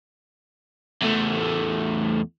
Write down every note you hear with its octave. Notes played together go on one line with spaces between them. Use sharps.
E2 A3